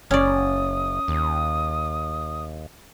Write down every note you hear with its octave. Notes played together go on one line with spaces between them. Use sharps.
F#1 C#4 D5 D#6
D#2